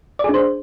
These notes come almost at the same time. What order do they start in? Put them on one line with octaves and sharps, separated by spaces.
D5 G#4 D4 C5